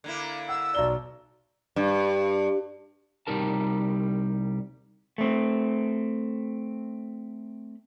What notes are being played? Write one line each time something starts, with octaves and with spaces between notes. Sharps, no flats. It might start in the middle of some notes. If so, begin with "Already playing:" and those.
D3 A#3 E4
F#5 E6
B1 D5 A#5 G7
G2
C2 G3 D#4 A#4 A5
A3 C4